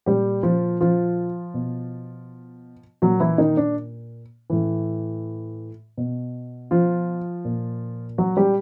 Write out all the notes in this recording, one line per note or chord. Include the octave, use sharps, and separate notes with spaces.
A#2 G3 G4
F3 F4
F3 F4
B2
A#2 F#3 F#4
E3 E4
D#3 D#4
D4
A2 E3
B2
F3 F4
A#2
F#3 F#4
G3 G4